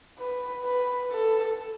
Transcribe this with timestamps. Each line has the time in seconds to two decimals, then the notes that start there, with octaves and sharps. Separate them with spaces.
0.19 B4
0.65 B4
1.11 A4